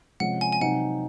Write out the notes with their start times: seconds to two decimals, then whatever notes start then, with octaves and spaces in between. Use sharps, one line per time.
0.20 C3 F3 G#3 C#4 G#4 F#5
0.41 G#5
0.52 G#5
0.61 C3 F#3 C4 D#4 F#5